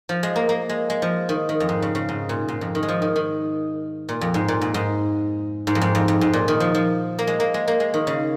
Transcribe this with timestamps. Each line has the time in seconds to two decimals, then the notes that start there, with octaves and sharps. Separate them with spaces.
0.09 F3
0.23 G#3
0.36 A#3
0.49 A#3
0.69 G#3
0.90 G#3
1.02 F3
1.29 D#3
1.49 D#3
1.60 F2
1.69 G#2
1.82 C#3
1.95 C#3
2.09 G#2
2.29 A#2
2.48 G#2
2.61 F2
2.75 D#3
2.83 G#3
2.88 F3
3.02 D#3
3.16 D#3
4.09 A#2
4.21 F2
4.34 G#2
4.48 A#2
4.61 G#2
4.74 G#2
5.67 G#2
5.75 F2
5.81 G#2
5.95 F2
6.08 F2
6.21 G#2
6.33 A#2
6.48 D#3
6.60 F3
6.75 F3
7.19 A#3
7.27 G#3
7.40 A#3
7.54 G#3
7.68 A#3
7.80 G#3
7.94 D#3
8.07 C#3